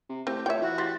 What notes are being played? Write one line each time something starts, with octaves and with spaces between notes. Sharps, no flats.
C3
A2 C4 G4
A2 F4 C#5 E5 G5
E3 E4 F#4
G4 C6 A6